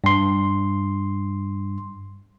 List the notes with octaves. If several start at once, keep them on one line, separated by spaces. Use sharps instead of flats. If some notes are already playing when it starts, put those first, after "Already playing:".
G2 C6